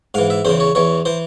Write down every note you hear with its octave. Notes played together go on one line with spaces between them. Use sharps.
G#2 E3 F5
E5
E2 C#3 E3 C5
C#5
E2 E3 C#5
E3 C5